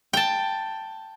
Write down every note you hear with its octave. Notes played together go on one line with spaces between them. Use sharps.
G5 A5